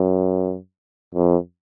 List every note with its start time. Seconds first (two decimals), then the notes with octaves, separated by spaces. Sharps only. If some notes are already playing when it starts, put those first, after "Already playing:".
Already playing: F#2
1.15 F2